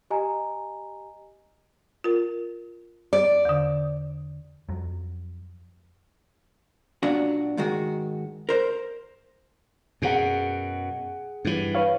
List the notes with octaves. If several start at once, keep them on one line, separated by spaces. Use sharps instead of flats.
G4 D#5 G#5 A#5
F4 A#4
D5
E2 D3
F2 F#3
A#2 F#3 D4 F#4
G#2 D#3 G#3 F#4
A#4 C5
F#2 B2 G#4 F#5
G2 E3
B4 C#5 F5